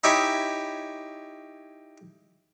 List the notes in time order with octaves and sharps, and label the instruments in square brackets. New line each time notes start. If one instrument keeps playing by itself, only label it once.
[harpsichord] D#4 E4 G4 C#5 G#5